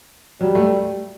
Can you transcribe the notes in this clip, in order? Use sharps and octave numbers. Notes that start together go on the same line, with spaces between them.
F#3 G3
A3